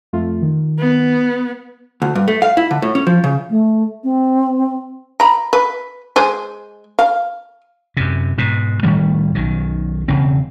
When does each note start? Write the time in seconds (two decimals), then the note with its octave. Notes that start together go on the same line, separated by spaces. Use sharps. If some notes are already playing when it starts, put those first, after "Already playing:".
0.13 F2 A3 F4
0.42 D#3
0.79 B3
2.02 D2
2.15 G2
2.28 A3
2.42 F5
2.57 E4
2.71 D3
2.82 A2
2.95 C#4
3.07 F3
3.24 C#3
3.50 A3
4.04 C4
5.20 A#5 B5
5.53 B4
6.16 G#3 C5 G#5
6.99 F5
7.97 F#2 C3
8.38 G#2 B2
8.83 A2 D#3 G3 A3
9.35 B1 D#3 F#3
10.08 E1 C#3 C4